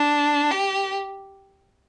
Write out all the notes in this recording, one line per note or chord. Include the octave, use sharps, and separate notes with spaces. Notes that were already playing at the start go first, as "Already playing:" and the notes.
Already playing: D4
G4